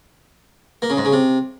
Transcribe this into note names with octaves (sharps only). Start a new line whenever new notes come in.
A#3
C#3
G#2
C#3
C3